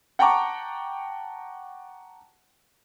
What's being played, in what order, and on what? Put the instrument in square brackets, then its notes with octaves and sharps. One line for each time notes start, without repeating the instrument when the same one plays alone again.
[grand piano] F#5 G5 A5 A#5 C#6 D6